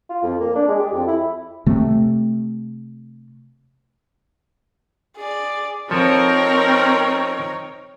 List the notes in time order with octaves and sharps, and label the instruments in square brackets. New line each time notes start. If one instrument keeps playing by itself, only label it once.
[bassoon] F4
F2
A#3
D4
G#3
G4
F2
E4
[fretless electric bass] C3 A3
[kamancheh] G#4 D5
[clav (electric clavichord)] F3 A4 G#5 [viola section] C4 A#4 [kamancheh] D#4 C#5